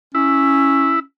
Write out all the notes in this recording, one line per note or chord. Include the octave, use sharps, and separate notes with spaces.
C#4 E4